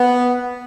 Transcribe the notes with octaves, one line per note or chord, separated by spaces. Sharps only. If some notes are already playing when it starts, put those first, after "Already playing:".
Already playing: B3